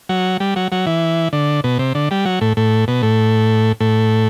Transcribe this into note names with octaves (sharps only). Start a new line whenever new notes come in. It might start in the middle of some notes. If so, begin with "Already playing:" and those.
F#3
G3
F#3
F#3
E3
D3
B2
C3
D3
G3
F#3
A2
A2
B2
A2
A2